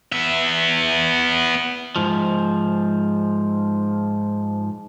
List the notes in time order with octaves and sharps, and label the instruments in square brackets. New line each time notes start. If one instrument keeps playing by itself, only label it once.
[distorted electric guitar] B3 E5
[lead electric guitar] G#2 F3